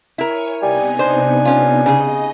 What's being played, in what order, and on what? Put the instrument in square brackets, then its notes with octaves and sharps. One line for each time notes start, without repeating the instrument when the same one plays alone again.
[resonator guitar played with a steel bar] E4 A#4 [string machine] C#5 G#5
[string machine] C3 B3 D#4 [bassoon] G3 [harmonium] G#5
[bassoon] D4 [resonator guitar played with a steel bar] C5
[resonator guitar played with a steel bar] C#4 F4
[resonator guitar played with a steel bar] C#3 G#4 [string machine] D#5